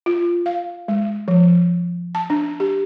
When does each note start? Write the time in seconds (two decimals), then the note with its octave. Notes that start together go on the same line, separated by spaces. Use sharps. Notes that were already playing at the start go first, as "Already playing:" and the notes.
0.06 F4
0.46 F5
0.88 G#3
1.28 F3
2.15 A5
2.30 D4
2.60 G4